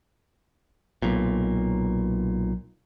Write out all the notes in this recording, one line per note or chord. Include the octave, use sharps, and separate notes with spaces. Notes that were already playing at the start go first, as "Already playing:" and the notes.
B1 A#2